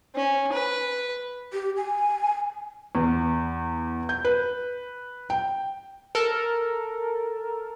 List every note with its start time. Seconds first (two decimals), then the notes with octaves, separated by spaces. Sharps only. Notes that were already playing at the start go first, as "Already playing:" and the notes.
0.15 C#4
0.52 B4
1.53 G4
1.77 G#5
2.95 E2
4.09 G6
4.25 B4
5.30 G5
6.15 A4 A#4